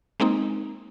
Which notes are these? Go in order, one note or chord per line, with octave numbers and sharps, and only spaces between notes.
G#3 A#3 C4 D#4